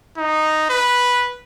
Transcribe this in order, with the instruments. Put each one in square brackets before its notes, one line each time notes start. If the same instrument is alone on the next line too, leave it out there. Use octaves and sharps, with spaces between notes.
[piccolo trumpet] D#4
B4